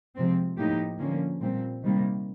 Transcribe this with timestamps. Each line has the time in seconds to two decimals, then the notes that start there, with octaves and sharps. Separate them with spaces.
0.16 C3 F3 G#3 C4
0.57 A2 F3 A#3 D#4 G4
0.99 D3 F3 A#3 C#4
1.42 A#2 G3 C4
1.84 C3 D#3 G3 A#3